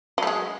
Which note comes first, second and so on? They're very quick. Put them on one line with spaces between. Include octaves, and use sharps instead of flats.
F#3 A3 G#3